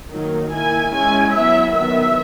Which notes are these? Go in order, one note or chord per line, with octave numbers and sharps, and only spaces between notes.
D#3 F#3 A#3 D#4
D#3 A#3 E4 G#5
G#3 C#4 E4 G#5
F#3 B3 E4 E5
D#3 F#3 B3 E5